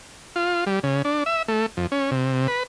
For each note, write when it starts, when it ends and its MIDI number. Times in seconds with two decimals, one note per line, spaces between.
0.36 0.64 65
0.67 0.79 55
0.83 1.02 49
1.05 1.24 62
1.26 1.42 76
1.48 1.66 57
1.77 1.87 41
1.92 2.11 61
2.11 2.47 48
2.48 2.63 71